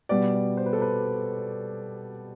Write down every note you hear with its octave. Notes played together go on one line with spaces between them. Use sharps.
B2 G3 B3 D5
D5
C5
B4
A4
B4